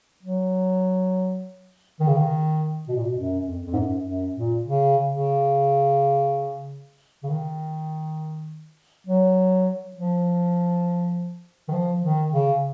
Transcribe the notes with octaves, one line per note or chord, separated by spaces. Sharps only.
F#3
D#3
C#3
D#3
B2
A#2
B2
F#2
F2
F2
G#2
F#2
F#2
A#2
C#3
C#3
C#3
D#3
F#3
F3
D#3
F3
D#3
C#3